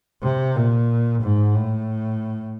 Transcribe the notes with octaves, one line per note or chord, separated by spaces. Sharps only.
C3
A#2
G#2
A2